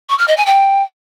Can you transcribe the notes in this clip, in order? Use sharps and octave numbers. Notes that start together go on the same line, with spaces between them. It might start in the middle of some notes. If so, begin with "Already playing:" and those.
C#6
F6
D#5
G#5
G5